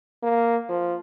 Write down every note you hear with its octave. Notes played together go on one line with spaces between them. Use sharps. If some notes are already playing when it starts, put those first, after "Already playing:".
A#3
F3